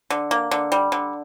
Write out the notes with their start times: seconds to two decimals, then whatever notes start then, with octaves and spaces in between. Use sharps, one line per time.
0.10 D3
0.31 A#3
0.51 D3
0.72 G3
0.92 D3